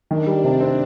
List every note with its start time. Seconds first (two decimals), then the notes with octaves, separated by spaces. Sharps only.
0.10 D#3 D4
0.26 G3
0.43 C3 D4
0.61 C4